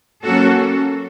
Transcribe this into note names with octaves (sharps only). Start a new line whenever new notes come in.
F#3 A#3 C#4 F#4 A4